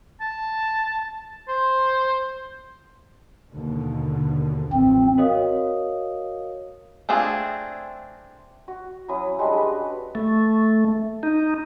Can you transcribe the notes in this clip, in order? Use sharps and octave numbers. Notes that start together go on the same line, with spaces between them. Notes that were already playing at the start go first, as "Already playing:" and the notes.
A5
C5
D#2 B2 D3
A1 G2 F3 C4
F#4 A#4 C#5 D#5 F5 D#6
A3 C4 D4 F4 G#4
F#4
F#3 C#4 E4 D#6
G3 G#3 D4 D#5
F#4 B4
A3
D#4